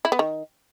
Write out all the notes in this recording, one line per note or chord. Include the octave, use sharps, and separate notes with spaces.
E4
B3
D#3